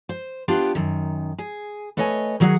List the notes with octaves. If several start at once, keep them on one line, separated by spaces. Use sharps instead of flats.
C5
B3 D4 F4 G4
F#2 D#3
G#4
A3 B4 C#5 D#5 E5 G#5
D#3 F#3 G#4 D5 F#5